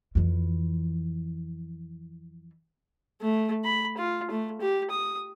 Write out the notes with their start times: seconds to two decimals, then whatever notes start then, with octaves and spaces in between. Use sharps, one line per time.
0.15 F2 E3
3.21 A3
3.64 B5
3.97 F4
4.31 A3
4.61 G4
4.90 D#6